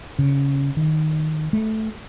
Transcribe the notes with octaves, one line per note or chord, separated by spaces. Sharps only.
C#3
D#3
A3